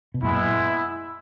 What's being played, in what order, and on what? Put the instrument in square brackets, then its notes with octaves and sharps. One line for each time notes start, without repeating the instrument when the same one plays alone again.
[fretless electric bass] B2
[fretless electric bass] F#2 A#2 [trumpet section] G#3 B3 E4